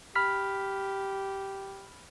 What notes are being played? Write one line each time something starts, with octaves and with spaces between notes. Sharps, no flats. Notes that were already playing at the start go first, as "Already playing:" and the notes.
G4 B5 F6 B6